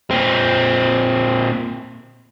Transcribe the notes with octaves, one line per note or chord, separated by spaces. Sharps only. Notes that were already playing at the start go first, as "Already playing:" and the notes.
A#2 C4